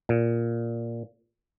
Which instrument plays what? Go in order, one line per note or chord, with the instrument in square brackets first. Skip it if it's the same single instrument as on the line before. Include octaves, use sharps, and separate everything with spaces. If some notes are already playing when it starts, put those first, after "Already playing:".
[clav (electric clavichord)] A#2